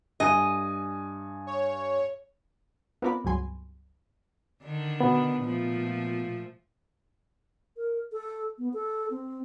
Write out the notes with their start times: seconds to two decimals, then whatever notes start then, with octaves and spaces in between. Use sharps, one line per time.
0.20 G2 D#5 G#5
1.47 C#5
3.02 B3 C4 F4 A#4 D5 B5
3.25 C#2 G2 F#3 G#5 C6
4.63 D3 D#3 D4
5.01 B2 B3
5.42 A#2 F3 A3
7.77 A#4
8.12 A4
8.59 B3
8.74 A4
9.11 C4